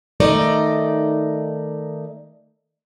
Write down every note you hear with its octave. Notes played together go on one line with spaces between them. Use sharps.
D#3 A3 D#4 D5 D#5